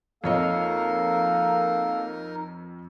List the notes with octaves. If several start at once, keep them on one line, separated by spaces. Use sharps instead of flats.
F2 A#3 D#4 A4 A#4 C#5 D#5 F5